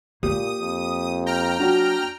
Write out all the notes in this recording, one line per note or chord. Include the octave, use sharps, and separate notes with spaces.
A#2 A#3 G4 D#6
F2
G5 A#5 F6
F#3 D4 F#4